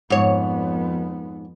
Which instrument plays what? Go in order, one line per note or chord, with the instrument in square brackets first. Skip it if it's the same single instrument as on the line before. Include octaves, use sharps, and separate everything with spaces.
[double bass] F2 B3 [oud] G#2 C#5